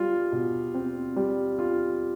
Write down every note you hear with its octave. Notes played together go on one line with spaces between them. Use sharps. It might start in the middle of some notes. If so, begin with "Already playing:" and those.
Already playing: G3 F4
B2
C4
G3
F4